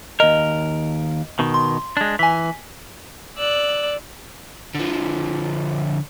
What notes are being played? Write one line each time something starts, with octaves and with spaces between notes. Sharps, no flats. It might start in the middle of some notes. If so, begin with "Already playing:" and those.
D#2 A#4 D#5
B2 D#3
C6
G#3 D4
E3 G#5 B6
D5 E6 F#6
D3 F3